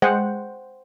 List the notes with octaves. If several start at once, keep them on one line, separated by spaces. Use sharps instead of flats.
G#3 C5 F#5 G5